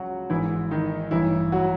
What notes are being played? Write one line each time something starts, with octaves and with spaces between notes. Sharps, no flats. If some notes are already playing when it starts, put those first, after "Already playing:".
Already playing: C#2 C#3 F3 F#3 F#4
G#1 G#2 E3 E4
D#3 D#4
A1 G2 E3 E4
F#3 F#4